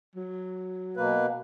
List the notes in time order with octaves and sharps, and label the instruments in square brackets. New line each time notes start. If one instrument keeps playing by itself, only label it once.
[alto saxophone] F#3
[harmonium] B2 A#3 B4